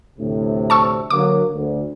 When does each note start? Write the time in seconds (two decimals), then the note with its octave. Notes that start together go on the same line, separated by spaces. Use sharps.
0.19 D2 A2 C3
0.70 A5 C#6 E6
1.10 D3 F#3 A#3 D6
1.54 D2